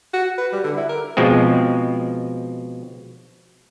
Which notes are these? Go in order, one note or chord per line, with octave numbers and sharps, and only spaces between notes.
F#4
B4
G3
D3
E4
A#4
B2 F3 G#3 C4